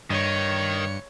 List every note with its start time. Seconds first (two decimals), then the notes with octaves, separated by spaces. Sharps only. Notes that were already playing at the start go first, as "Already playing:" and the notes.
0.10 G2 D#3 C#5 C#7